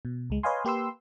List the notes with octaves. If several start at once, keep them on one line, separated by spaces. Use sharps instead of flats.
B2
C#2 G#3
B4 C#5 D#5 F5 G#5 C6
A#3 G4 B4 C6 E6